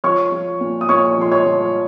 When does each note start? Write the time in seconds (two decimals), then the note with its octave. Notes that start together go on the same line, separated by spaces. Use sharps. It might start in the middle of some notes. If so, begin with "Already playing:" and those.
0.04 F3 C#5 C#6
0.32 F3
0.61 A#2
0.81 D#6
0.89 A#2 C#5 C#6
1.18 F3 C6
1.32 C#5 C#6
1.46 F3